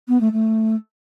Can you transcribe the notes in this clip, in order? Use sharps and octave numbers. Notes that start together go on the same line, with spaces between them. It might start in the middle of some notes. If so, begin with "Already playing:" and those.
B3
A3
A3